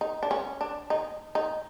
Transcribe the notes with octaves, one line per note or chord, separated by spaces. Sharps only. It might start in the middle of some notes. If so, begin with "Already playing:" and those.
D#4
D4
C#4
D4
D#4
D#4